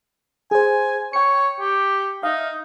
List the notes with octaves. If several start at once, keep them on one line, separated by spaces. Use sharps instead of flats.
G#4 C5 G#5
C#5 G5 C#7
G4
D#4 E5 F5